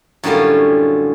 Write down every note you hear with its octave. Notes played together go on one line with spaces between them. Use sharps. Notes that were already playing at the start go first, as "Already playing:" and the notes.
F#2 A2 D3 G3 C#4 F4